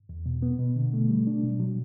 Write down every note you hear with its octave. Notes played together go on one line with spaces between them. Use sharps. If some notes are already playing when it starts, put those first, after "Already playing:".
E2
B2
B3
B2
D3
A3
G3
D4
B2
F#3